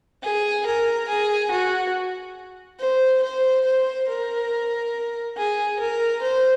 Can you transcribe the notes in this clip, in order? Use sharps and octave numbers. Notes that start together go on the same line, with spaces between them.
G#4
A#4
G#4
F#4
C5
C5
C5
A#4
G#4
A#4
C5